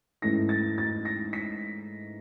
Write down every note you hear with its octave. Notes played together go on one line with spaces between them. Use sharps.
G#2 E3 A3 C#4 E4 A#6
A6
A6
A#6
B6